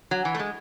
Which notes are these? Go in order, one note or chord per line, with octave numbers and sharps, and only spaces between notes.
F#3
E3
A3
G#3